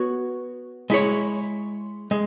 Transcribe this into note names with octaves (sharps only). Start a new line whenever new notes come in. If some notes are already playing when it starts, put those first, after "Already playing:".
Already playing: B3 F#4 C#5
G#3 E4 C#5
G#3